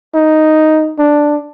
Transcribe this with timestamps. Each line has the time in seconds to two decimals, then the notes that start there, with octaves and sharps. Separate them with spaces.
0.14 D#4
0.99 D4